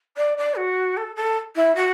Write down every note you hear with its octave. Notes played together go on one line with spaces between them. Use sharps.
D5
D5
F#4
A4
A4
E4
F#4